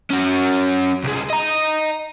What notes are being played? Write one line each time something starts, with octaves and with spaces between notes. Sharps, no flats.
C#4 F#4
C2 G#3
D#5 A#5